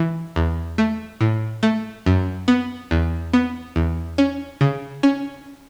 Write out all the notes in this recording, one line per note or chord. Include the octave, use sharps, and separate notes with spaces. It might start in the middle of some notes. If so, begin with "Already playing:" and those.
Already playing: E3
E2
A3
A2
A3
F#2
B3
E2
B3
E2
C#4
C#3
C#4